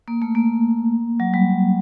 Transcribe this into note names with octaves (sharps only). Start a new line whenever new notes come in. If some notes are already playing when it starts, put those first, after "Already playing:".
A#3
A3
A#3
F#3
G3